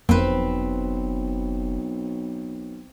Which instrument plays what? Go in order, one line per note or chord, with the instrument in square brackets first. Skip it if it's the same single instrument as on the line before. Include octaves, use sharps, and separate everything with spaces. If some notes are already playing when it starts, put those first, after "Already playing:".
[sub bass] F#1 [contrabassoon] B1 [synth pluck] F2 A#3 [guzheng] C4 B4